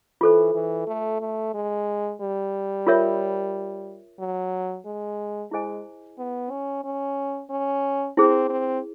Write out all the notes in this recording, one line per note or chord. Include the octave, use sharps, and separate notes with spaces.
E3 F4 A4 C5
E3
A3
A3
G#3
G3
F4 A#4 C#5 E5
F#3
G#3
G#3 E4 G#4 C5 D#5 G#5
B3
C#4
C#4
C#4
C4 E4 G#4 C5
C4